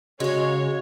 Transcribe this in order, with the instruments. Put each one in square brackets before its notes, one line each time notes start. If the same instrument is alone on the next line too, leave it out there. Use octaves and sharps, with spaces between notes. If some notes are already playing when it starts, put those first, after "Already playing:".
[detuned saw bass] C#3 [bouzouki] G#3 [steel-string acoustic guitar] F#4 F5 [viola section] C#5